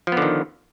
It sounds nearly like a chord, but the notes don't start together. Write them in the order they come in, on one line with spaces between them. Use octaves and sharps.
F3 B3 D3 D#3